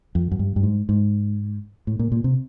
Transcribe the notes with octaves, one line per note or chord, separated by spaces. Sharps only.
F2
F#2
G2
G2
G#2
G#2
A2
A#2
A#2
C3